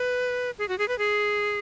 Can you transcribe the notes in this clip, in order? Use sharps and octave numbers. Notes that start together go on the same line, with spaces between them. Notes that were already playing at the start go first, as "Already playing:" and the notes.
Already playing: B4
G#4
F#4
G#4
B4
G#4